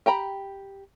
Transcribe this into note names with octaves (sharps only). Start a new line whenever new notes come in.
G4 G5 A#5 B5